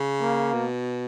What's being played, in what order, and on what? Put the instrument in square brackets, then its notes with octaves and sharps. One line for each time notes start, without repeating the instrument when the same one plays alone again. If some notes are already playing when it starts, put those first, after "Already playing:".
Already playing: [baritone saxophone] C#3
[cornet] A#3
[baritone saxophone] B2